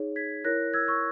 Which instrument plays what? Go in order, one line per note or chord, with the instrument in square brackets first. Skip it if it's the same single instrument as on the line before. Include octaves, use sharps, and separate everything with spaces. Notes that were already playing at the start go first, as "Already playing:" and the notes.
Already playing: [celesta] D#4 G#4 C#5
G#6 B6
E4 A#4 C#5 F#6 A#6
E6 G#6
C#6 E6